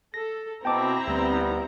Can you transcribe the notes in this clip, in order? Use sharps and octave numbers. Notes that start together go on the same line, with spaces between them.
A4 A#6
B2 C4 E4 G5 A5 A#5 D6
D2 G3 B3